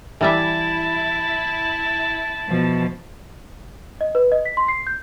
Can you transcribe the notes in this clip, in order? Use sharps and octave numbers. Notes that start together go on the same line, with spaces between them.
E3 G3 E4 E5 A5
B2 F3
D#5
B4
D#5
B6
C6
C7
G6